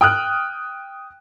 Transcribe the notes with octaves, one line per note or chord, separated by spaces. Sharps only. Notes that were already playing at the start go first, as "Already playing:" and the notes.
G5 D#6 F6 F#6